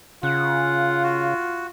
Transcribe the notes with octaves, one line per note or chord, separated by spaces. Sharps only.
C#3 F4 F#5
F#4